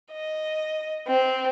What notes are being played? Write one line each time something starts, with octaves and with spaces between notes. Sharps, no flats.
D#5
C4